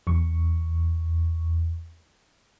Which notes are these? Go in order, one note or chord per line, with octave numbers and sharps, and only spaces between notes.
E2 C#6